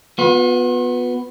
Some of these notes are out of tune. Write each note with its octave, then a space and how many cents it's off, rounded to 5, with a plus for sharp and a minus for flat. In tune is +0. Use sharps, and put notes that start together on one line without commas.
B3 +0 F4 +45